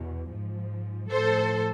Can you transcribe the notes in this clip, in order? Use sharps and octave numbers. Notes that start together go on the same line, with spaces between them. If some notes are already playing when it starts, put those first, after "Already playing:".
Already playing: E2 B2
G#2 F3
A2 F3 A4 C5